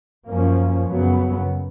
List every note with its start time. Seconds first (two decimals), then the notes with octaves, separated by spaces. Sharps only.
0.27 F#2 F3 A#3 C#4
0.86 F#2 C#3 F#3 B3